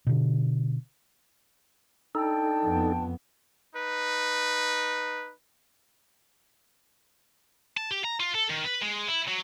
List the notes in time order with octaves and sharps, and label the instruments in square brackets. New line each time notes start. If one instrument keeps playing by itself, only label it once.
[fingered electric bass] B2 D3
[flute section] D4 G5 A5 [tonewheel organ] D#4 A4
[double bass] F2 B3
[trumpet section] D#4 B4
[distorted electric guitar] A5
G4
A#5
F4
A4
D#3
B4
G#3
E4
F#3